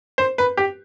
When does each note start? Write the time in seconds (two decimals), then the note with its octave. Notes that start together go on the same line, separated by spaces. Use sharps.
0.18 C5
0.38 B4
0.57 G4